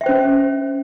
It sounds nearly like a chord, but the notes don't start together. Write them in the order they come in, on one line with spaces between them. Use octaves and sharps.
E5 G5 C5 C#4